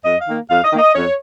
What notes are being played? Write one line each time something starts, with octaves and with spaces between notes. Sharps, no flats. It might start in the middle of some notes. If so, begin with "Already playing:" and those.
F2 D#5
F5
D#3 A#3
F2 F5
D#5
D#3 A#3
D#5
F2 C#5